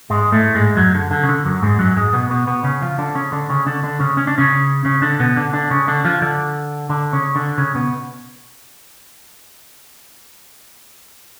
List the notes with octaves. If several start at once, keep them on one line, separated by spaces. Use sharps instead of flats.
G#2 G#3
A2 A3
G#2 G#3
F#2 F#3
D3
D3
C#3
D3
F#2 F#3
G#2 G#3
F#2 F#3
G#2 G#3
B2 B3
B2 B3
B2 B3
C#3 C#4
F3 F4
D3 D4
C#3 C#4
D3 D4
C#3 C#4
D3 D4
D3 D4
C#3 C#4
C#4
D4
C#3 C#4
C#3 C#4
D3 D4
B2 B3
D3 D4
D3 D4
C#3 C#4
D3 D4
F3 F4
D3 D4
D3 D4
C#3 C#4
D3 D4
C#3 C#4
B2 B3